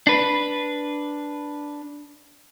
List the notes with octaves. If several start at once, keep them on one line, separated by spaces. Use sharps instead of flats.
D4 B4